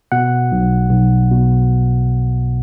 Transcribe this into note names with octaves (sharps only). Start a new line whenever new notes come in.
B2 F#5
B1
B1
B2